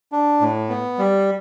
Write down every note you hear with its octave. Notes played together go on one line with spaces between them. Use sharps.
D4
A2
B3
G3